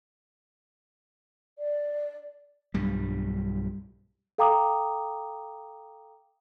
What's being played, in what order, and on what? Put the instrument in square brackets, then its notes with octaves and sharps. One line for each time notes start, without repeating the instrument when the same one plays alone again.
[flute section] D5
[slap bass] B1 G2 G3
[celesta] A4 F5 G5 A#5 D6 D#6